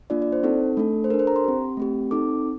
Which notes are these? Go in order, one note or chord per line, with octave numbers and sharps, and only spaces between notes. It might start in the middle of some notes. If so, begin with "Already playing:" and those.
A#3 D4 F4 D5
D5
C5
C4 D#4 A4
A3 D4 A4
C5
D4 A4 A#4
C5
A#5
C6
C4 G4
A3 C4 G4
C4 D#4 A4 D6